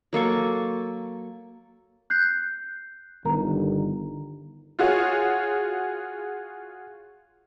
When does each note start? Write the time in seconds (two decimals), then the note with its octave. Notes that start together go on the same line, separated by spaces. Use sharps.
0.13 F#3 A#3 A4 C#6
2.10 F#6 G6 C7
3.25 G1 D#3 A#4 A#5
4.79 F4 F#4 G#4 C#5